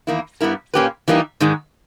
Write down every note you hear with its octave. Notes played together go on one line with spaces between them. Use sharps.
E2 D#3 A#3 E4
G2 G3 B3 E4 A#4
A#2 A#3 C#4 G4 B4
E3 G3 A#3 D#4
G#2 D#3 G#3